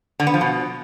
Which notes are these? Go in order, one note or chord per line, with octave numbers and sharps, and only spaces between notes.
D3
B3
F3
B2